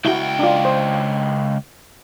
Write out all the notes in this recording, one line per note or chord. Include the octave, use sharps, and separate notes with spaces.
C#2 E4 F#4 G5
D4 F4
C5